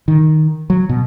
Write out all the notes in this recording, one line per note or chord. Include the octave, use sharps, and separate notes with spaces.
D#3
F#3
B2